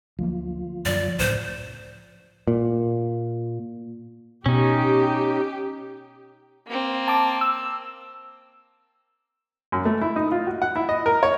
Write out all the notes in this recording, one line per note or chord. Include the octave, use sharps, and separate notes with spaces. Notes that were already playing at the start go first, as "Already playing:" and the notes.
D2 F3 F#3 A#3
F#2 D3 F#3 D5
C#2 A2 C#3 C5
A#2
B2 C#4 D#4 G4
A#3 C4
A5 D6
E6
F#2
A3
E4
D#4
F4
F#4
F#5
E4
D#5
A#4
C#5